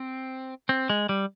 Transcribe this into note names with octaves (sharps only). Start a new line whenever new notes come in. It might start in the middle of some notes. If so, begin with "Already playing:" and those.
Already playing: C4
C4
G#3
G3